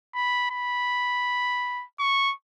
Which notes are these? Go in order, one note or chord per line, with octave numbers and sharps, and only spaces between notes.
B5
B5
C#6